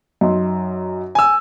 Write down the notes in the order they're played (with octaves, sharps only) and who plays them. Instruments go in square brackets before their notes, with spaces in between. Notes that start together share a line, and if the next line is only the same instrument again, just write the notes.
[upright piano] F#2 D#4 C6
[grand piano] G#5 E6